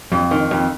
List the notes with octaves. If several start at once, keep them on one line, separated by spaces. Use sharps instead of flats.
F2
D#3
F2